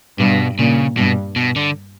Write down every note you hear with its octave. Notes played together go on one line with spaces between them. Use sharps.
G2 B2
A#2 C#3
G2 B2
B2
D3